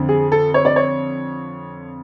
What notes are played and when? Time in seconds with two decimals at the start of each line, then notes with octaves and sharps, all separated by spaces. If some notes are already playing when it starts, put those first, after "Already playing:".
Already playing: F2 D3
0.09 G#4
0.32 A4
0.54 C#5
0.65 D5
0.76 C#5